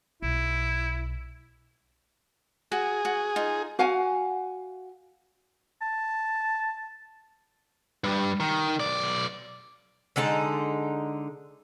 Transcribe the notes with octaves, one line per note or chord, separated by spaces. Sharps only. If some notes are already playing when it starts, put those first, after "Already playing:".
B1 E4
F#4 G#4
F#4
D#4 F4
F#4 F5 F#5 G#5
A5
G2 G3
D#3
B1 D5
D3 G#3 D#4 A5